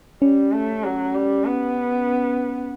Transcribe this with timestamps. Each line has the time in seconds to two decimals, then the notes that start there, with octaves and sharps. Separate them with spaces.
0.22 G3 C#4
0.52 A3
0.84 F#3
1.14 G3
1.45 B3